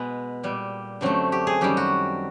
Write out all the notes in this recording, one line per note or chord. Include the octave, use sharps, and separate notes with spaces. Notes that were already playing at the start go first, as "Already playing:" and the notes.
Already playing: B2 G#3 B3
A#2 G3
F#2 D3 F#3 A3 C4
G4
G#4
F#2 D#3 G3 G4
F#4